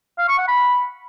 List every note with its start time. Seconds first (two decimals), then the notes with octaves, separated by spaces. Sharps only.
0.18 F5
0.28 C#6
0.38 F#5
0.48 B5